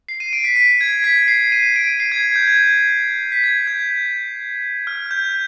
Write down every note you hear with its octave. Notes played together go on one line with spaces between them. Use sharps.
C7
D#7
D7
B6
B6
G#6
B6
C7
D#7
D7
C7
G#6
G6
G#6
B6
G#6
G6
F6
G6